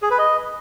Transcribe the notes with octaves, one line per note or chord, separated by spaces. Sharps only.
G#4
B4
D#5